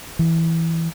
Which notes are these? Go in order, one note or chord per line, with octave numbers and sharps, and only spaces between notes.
E3